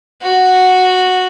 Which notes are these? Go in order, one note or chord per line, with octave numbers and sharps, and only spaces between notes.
F#4